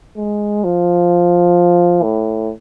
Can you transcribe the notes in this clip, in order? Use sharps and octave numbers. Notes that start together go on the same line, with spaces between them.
G#3
F3
A2